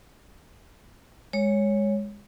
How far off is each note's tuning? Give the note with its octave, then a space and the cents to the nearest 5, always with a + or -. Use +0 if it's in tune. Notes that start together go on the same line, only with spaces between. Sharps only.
G#3 -15 C#5 +0